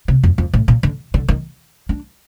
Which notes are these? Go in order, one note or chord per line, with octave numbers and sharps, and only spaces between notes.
C3
F2
F2
A2
A#2
D3
D3
D#3
D4